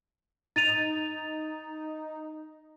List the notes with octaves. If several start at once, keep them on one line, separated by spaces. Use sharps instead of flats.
D#4 A6 D#7 F7